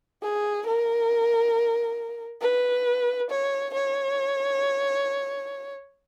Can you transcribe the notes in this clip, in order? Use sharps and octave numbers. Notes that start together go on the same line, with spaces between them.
G#4
A#4
B4
C#5
C#5